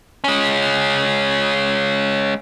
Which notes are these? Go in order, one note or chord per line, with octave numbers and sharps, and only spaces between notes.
G#3 C#4